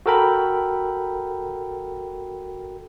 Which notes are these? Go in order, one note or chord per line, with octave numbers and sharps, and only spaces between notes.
F#4 A4 A#4 G5 B5